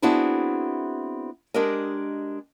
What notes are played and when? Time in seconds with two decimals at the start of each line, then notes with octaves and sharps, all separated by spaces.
0.02 B3 C4 D4 E4 F#4 G#4
1.54 G#3 D4 G4 A#4 D#5